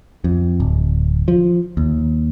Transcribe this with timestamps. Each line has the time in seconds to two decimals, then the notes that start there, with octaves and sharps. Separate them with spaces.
0.24 F2
0.60 D1
1.28 F3
1.77 D#2